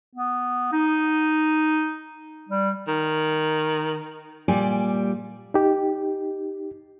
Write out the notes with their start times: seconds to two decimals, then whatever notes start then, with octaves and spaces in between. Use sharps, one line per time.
0.15 B3
0.72 D#4
2.49 G3
2.88 D#3
4.48 A#2 G3 D5 G#5
5.54 D#4 G4